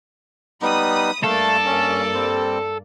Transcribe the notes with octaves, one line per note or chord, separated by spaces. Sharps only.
G3 B3 D#4 B5 D#6
G2 A3 A#3 A4 D5 F5
C#4
G3 C4